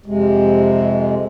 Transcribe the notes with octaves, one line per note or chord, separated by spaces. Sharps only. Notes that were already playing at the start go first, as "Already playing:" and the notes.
F2 C3 G#3